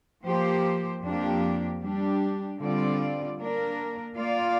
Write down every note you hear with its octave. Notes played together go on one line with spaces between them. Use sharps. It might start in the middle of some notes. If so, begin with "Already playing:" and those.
F3 A#3 G4 C5
F2 F3 A#3 D4 G4
G3 D4 G4
D3 G3 C4 F4 D5
A#3 D4 A#4
A#3 F4 D5 F5